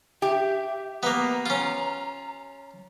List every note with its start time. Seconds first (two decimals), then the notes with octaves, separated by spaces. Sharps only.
0.22 G4 E5
1.03 A#3 B3 A#5
1.46 C#4 F4